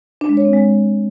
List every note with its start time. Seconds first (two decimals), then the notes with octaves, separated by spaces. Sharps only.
0.21 D4
0.29 G#3
0.37 C#5
0.45 C4
0.53 G#3